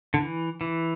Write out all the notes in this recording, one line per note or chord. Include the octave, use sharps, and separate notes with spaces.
D3
E3
E3